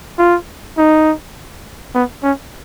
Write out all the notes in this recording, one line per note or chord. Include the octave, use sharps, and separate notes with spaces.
F4
D#4
B3
C#4